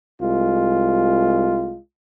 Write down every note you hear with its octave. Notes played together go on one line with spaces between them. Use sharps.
C2 G#3 F4